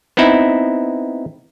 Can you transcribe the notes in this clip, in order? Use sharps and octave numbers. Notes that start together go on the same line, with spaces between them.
B3 C4 D#4 E4